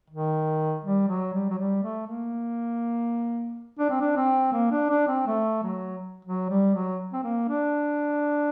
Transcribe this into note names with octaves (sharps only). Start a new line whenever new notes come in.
D#3
G3
F#3
G3
F#3
G3
A3
A#3
D4
C4
D4
C4
A#3
D4
D4
C4
A3
F#3
F#3
G3
F#3
C4
A#3
D4